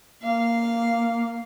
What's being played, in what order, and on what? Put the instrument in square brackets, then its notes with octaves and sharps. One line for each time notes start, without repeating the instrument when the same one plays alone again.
[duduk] A#3 [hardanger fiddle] F5